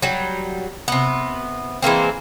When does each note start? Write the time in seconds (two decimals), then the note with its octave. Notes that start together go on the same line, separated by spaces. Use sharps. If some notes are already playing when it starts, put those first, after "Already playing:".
0.02 F#3 G3
0.88 C3 B3
1.82 E3 G#3 A#3 C4